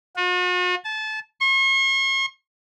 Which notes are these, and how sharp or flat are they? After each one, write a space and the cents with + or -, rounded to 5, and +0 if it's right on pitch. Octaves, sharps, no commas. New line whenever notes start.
F#4 -45
A5 -25
C#6 -45